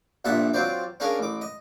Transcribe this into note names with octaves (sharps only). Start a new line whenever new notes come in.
A#1 G2 A#2 E5 F#5 A5
F#3 C4 F4 C5 D5
C#4 D4 G#4 A#4 F5
A1 D6
D#5